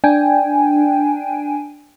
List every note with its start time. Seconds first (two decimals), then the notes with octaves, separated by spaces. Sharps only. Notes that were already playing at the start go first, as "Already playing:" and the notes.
0.04 D4 G5 G#5